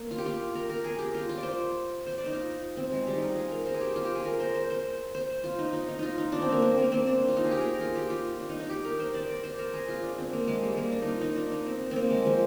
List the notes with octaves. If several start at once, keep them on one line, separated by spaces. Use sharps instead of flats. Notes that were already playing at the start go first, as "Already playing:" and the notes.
Already playing: A#3
F4
G4
F4
A#4
A#4
G#4
G4
F4
F4
D5
C5
C5
D5
D#4
F4
C4
G#3
G3
D#4
F4
G#4
A#4
C5
G#4
G4
F4
G4
G#4
A#4
C5
C5
C5
C5
F4
D#4
D#4
D#4
D#4 F4
D#4
D4
C4
A#3
C4
A#3 C4
C4
D4
F4
D#4
G#4
G4
G#4 A#4
F4
G4
F4
D4
D#4
D#4
G4
A#4
C5
D5
D5
C5
A#4
G#4
F4
D4
C4
A#3
G#3
G3
A#3
D4
D#4 F4
D#4
D4
D#4
C4
A#3 C4
G#3
F3